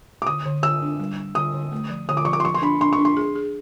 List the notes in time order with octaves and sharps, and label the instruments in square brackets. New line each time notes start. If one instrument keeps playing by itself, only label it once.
[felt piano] D6
[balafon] D3 [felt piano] D#6
[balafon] D3
[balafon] D3 [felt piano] E6
[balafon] D4
G3
G3
[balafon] D3 [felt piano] D#6
[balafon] D3
A3
F3
[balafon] D3 [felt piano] D#6
[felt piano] D6
[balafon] F3 [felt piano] C#6
[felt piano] D6
C6
[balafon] F3 [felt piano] C#6
[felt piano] C6
[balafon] D4 [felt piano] B5
[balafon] D4 [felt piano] C6
[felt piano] C#6
[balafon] D4
[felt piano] C6
[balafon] G#4
G#4